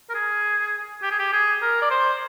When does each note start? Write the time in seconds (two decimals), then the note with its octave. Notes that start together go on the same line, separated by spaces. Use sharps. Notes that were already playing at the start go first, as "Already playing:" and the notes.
0.09 A#4
0.15 G#4
1.02 G4
1.11 G#4
1.19 G4
1.33 G#4
1.62 A#4
1.82 D5
1.90 C5